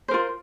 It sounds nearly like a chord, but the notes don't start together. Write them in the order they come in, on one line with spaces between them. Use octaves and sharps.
C5 A#4 F4